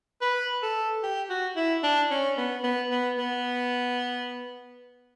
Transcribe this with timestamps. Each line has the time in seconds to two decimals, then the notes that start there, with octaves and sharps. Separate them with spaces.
0.22 B4
0.63 A4
1.03 G4
1.30 F#4
1.56 E4
1.83 D4
2.11 C#4
2.37 B3
2.64 B3
2.91 B3
3.18 B3